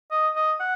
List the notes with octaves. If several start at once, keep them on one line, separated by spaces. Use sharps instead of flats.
D#5
D#5
F#5